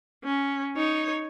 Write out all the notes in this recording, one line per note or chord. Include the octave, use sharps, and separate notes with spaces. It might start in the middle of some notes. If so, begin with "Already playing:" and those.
C#4
D#4 C#5